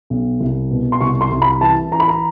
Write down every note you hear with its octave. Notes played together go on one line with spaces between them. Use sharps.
B1
C2
B2
C6
C2 C#6
C6
C2
B5
E3 A5
E3 A#5
B5
A#5